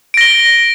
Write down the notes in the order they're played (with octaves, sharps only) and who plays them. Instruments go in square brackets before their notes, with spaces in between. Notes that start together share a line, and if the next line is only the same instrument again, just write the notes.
[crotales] D7
A#6
G7